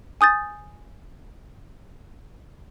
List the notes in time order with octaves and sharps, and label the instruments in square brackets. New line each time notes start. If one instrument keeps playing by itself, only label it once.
[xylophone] G#5 D#6 G6 A6